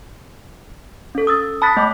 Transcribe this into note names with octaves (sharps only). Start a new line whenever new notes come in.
C#4 A4
D#6 E6 A6
A5 B5 D#6 F#6 A6 B6
A3 D#5 G5 A5 D6